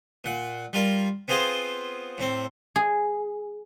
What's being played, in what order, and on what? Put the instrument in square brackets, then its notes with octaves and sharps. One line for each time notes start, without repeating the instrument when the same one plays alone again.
[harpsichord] A#2 F#5
G3 F4 A#4
B3 C4 F4 G#4 C5
A2 C4
[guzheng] G#4